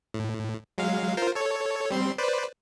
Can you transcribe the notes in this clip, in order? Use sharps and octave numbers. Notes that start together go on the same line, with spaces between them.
A2
F#3 G#3 F5
F4 A#4 C5
A4 C#5
G3 C4 C6
B4 C5 D5